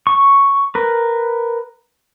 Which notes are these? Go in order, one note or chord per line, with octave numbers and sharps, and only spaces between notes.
C#6
A#4 B4